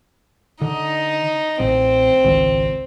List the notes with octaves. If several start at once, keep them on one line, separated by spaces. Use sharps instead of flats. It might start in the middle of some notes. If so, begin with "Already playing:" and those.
D3 D#4
A1 C4
G#1 C#2